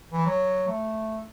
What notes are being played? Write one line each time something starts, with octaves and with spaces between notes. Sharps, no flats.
E3
F#3
A3